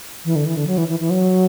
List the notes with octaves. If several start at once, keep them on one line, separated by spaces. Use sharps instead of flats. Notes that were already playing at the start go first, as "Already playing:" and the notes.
E3
D3
E3
D3
F#3
E3
E3
E3
F#3